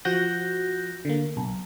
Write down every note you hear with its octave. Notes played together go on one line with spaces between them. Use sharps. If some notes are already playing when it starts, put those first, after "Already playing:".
F3 F#4 F#6 G6 A#6
D3 A#3
B1